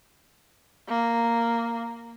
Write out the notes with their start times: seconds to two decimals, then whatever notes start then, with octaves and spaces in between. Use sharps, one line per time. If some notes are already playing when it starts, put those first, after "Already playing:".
0.88 A#3